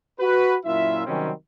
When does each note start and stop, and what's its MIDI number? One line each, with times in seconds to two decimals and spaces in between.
0.20 0.56 66
0.20 0.56 71
0.66 1.03 42
0.66 1.03 46
0.66 1.03 64
0.66 1.03 65
0.66 1.03 76
1.06 1.31 48
1.06 1.31 51
1.06 1.31 54
1.06 1.31 55
1.06 1.31 60
1.06 1.31 61